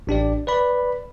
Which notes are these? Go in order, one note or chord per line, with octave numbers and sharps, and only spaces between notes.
A1 D4 G4 D5
B4 D5 B5